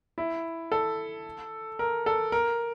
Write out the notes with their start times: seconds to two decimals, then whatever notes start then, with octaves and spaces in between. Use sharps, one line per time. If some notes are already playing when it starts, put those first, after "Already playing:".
0.18 E4
0.72 A4
1.79 A#4
2.06 A4
2.32 A#4